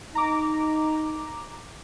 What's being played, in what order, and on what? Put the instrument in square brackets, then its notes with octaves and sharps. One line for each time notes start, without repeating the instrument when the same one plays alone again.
[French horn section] D#4 [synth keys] A#5 D6